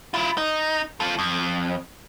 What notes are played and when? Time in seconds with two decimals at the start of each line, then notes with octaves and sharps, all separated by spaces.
0.14 E4 F4
0.38 D#4
1.00 F4 A4
1.19 F2